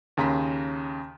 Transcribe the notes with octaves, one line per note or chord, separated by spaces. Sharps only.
D#2 C#3 A#5 C6 B6